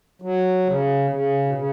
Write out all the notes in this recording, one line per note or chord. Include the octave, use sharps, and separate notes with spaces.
F#3
C#3
C#3
B2
C#3